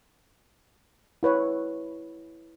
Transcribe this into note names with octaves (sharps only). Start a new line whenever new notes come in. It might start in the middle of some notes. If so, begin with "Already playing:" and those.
E4 B4 C#5